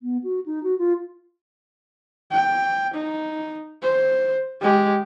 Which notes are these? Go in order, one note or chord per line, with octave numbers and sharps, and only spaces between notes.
B3
F#4
D#4
F#4
F4
G5
D#4
C5
G#3 G4